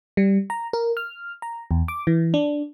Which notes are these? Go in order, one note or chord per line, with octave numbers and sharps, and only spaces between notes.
G3
A#5
A#4
F6
A#5
E2
D6
E3
D4